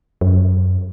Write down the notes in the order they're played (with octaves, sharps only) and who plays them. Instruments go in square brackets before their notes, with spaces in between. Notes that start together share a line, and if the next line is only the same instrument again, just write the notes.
[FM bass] F#2